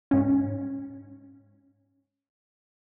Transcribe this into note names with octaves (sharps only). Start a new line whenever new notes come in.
G#2 C#4